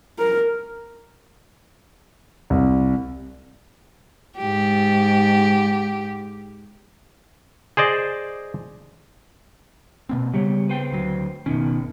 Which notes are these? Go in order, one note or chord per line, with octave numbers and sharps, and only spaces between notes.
A#4
C2
G#2 G4
G#4 C5 D5 D#5
B2 A#3 C4
C#3 G3 B3 G4 C#5
B4 C5 G5
D2 F#3
F#1 B2 D#3 C#4